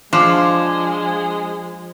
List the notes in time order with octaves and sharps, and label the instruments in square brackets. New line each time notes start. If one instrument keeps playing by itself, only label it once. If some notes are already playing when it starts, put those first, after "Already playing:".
[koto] F3 [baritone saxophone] G#3 [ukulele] D4